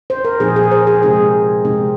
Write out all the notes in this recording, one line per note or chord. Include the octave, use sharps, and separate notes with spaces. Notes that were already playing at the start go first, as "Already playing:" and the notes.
C5
A#4
A#2 F3 C4 D#4 G#4
G#4
A#4
C5
G#4
C3 G#3 C4 D#4 G#4
C3 G#3 C4 D#4